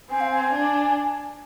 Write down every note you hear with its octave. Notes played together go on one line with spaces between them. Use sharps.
C4 G#5
F5
G#5
D4